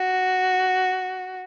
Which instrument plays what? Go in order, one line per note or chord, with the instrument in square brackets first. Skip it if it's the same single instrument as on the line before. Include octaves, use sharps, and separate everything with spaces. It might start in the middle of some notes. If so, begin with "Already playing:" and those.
Already playing: [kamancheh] F#4